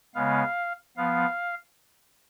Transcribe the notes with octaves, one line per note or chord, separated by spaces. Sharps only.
C#3 G#3 B3 F5
F3 B3 F5